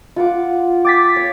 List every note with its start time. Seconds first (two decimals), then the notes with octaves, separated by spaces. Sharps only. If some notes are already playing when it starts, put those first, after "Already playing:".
0.16 F4 F#5 D6
0.85 G5 D6 A6 B6
1.16 C#5